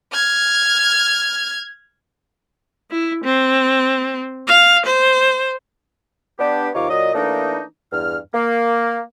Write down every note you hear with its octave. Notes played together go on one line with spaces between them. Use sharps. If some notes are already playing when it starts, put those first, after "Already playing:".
F6 G#6
E4
C4
F5
C5
B3 D4 G4
D#2 C3 D#4 F4 C#5 D6
A#2 F#3 D5 D#5
E3 A3 A#3 D4 D#4
E2 G2 F6
A#3